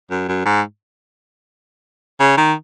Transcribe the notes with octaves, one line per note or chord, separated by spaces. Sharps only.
F#2
F#2
G#2
C#3
D#3